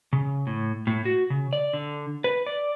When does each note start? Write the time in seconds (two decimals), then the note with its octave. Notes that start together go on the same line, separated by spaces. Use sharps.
0.13 C#3
0.47 A2
0.87 A2
1.05 F#4
1.30 C#3
1.53 D5
1.73 D3
2.24 B4
2.46 D5